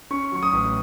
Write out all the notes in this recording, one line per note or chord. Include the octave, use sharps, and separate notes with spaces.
C#4 C#6
F#3 C#6
D#6
A1